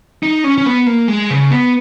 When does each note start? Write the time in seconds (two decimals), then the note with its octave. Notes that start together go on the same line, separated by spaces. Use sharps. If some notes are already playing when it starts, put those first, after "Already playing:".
0.23 D#4
0.44 C#4
0.58 C#4
0.66 B3
0.87 A#3
1.08 G#3
1.30 C#3
1.51 B3